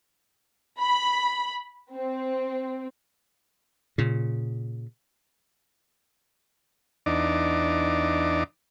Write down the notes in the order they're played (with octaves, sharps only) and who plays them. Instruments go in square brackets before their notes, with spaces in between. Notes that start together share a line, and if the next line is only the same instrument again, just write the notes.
[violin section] B5
C4
[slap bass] A#2 C#3
[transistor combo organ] E2 D4 D#4 D6